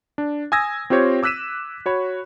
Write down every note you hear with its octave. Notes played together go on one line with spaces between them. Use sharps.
D4
G#5 D#6 E6 G#6 A#6
C4 F4 G4 C5 C#5
D6 E6 F#6 B6 D#7 E7
F#4 C#5 B5